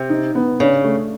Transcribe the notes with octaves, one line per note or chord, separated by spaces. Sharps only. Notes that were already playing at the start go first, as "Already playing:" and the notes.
Already playing: C3
D#4
B3
C#3 D4
A3